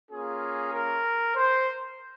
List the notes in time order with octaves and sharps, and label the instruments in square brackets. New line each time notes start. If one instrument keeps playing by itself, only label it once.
[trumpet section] A#3 C#4 F4 G#4
A#4
C5